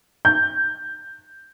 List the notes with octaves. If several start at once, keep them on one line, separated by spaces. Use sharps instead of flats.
G6